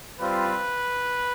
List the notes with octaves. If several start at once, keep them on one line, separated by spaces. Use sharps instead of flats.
G3 C4 F4 B4